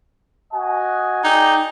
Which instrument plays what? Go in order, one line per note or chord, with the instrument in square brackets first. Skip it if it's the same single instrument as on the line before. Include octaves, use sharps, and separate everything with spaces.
[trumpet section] F#4 D#5 G#5
[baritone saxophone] D#4 [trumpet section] G#4 D5 G5